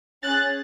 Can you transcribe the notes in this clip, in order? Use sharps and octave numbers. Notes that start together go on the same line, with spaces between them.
C#4 G#4 F#6 A6